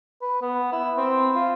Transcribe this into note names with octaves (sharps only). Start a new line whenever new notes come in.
B4
B3
E4
C4
F4